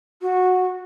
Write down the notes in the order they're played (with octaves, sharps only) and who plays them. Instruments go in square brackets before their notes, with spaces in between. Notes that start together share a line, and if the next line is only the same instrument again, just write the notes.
[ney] F#4